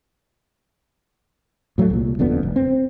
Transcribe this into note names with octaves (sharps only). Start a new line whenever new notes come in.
A2 F#3 G#3 A3
C2 A#2
D#1 F2 D3 B3
F1
C4